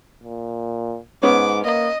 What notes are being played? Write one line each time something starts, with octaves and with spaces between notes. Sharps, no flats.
A#2
G#2 B3 C#4 D6
A#3 D#5